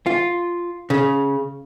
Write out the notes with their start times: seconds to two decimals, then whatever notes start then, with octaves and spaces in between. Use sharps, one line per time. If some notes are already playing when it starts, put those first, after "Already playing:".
0.06 F4
0.90 C#3